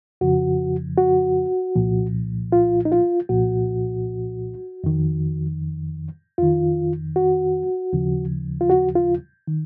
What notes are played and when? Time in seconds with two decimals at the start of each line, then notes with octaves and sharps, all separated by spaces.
0.21 F2 C#3 F3 F#4
0.98 F#4
1.75 C2 A#2 F3
2.52 F4
2.85 D#4
2.92 F4
3.29 C2 A#2 F3 F#4
4.84 F2 D#3
6.38 F2 D#3 F4
7.16 F#4
7.93 D#2 C#3 F3
8.61 F4
8.70 F#4
8.96 F4
9.48 D#3